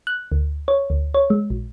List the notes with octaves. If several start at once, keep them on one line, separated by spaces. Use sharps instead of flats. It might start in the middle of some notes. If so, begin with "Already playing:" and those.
F#6
D2
C#5
D2
C#5
G#3
A#1